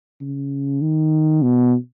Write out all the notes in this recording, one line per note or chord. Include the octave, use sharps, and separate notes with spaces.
C#3
D#3
B2